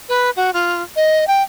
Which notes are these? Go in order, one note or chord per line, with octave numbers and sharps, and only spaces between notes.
B4
F#4
F4
D#5
G5